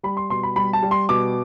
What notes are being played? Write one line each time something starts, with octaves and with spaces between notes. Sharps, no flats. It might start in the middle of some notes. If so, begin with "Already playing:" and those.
G3 B5
C6
B2 C6
B5
G3 B5
A5
G3
C6
B2 D6